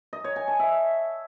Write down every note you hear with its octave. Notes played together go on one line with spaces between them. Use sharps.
D#5
C#5
G#5
A5
E5